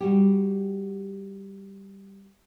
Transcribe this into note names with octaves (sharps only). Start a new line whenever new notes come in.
G3 F#4 G4